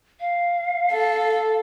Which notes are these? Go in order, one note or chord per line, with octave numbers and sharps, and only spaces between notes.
F5
A4